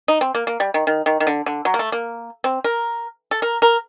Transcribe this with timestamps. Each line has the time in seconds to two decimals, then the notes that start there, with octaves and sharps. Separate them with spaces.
0.08 D#4
0.21 C4
0.35 A#3
0.47 A#3
0.60 G3
0.74 D#3
0.87 D#3
1.06 D#3
1.20 D#3
1.27 D3
1.46 D3
1.65 F#3
1.74 A#3
1.79 A3
1.92 A#3
2.44 C4
2.64 A#4
3.31 A4
3.42 A#4
3.62 A#4